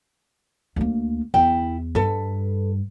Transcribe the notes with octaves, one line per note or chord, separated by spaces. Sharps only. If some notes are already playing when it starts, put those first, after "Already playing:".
D2 A#3
E2 E4 G5
G2 A4 B4